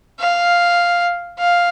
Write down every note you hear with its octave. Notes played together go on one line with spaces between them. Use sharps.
F5
F5